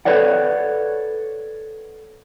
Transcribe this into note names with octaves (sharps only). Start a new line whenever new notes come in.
A4 B4 C#5 D5 F#5